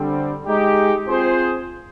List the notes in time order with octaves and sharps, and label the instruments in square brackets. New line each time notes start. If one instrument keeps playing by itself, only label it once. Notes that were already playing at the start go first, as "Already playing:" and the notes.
Already playing: [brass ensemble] D3 G3 C4
G#3 D#4 G4
C4 F4 G#4 C5